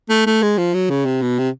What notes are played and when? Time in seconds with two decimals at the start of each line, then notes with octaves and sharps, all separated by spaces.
0.09 A3
0.26 A3
0.42 G#3
0.58 F3
0.74 F#3
0.90 C#3
1.05 C3
1.21 B2
1.38 C3